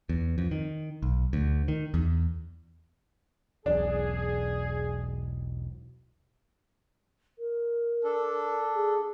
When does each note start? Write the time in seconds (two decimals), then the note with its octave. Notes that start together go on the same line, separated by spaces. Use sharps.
0.09 E2
0.38 F2
0.51 D#3
1.03 B1
1.33 D2
1.68 D#3
1.94 E2
3.66 E1 B1 D4 G#4
7.38 A#4
8.04 D4 A4
8.75 G#4